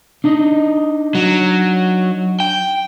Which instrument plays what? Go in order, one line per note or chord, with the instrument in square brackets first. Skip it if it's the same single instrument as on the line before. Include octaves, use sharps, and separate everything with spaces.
[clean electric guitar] D4 D#4 D#5
[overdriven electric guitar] F#3
G5